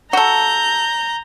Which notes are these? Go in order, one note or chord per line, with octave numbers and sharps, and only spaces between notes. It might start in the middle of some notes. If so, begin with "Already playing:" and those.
F#4 A4 A#5 G6